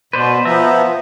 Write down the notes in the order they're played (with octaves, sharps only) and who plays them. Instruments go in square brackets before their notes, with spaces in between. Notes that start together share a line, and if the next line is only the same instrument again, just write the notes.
[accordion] B2 [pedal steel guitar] B4 C5 D5
[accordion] F3 B3 [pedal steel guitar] E5 A#5